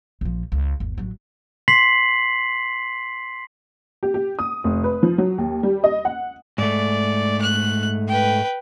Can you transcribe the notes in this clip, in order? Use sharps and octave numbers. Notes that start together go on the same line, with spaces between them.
A#1 F3
C#2
G1 D#2
A1 F#3
C6 B6 C7 F#7
G4
G4
D#6
F1
B4
F3
F#3
D#2
G3
D#5
F#5
G#2 A3 D5
F#6
B4 G5